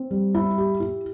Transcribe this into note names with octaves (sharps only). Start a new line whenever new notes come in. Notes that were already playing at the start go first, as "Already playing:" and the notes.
Already playing: C4
G3
E4
G4
E4